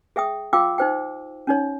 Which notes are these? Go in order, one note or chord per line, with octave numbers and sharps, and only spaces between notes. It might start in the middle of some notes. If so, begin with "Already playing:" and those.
G#4 E5 G5 D#6
F4 F5 G5 D6 E6
D#4 C5 G5
C#4 D#4 C#5